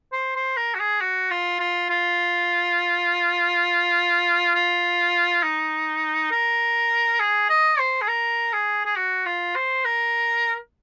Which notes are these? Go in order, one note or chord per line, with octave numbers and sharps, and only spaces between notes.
C5
C5
A#4
F#4
G#4
F#4
F4
F4
F4
F4
D#4
A#4
G#4
D#5
C5
G#4
A#4
G#4
G#4
F#4
F4
C5
A#4